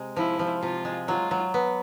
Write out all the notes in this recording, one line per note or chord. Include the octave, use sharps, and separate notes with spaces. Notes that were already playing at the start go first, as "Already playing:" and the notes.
Already playing: C3 G#3
F3 E4
F3
C3 F4
G#3
F#3 F4
F#3
B3